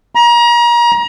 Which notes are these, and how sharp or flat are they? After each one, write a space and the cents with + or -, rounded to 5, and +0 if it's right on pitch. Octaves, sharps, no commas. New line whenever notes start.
A#5 +35